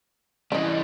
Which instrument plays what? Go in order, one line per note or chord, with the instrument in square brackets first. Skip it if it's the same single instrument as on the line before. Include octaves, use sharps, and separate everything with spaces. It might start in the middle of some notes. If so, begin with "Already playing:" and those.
[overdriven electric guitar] E3 G3 [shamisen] C#4 D#5